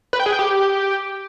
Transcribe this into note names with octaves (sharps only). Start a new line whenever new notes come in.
B4
G5
G#4
G5
G4